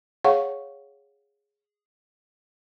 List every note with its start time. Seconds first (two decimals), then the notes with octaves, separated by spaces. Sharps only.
0.24 G#4 C#5 F5 F#5 C#6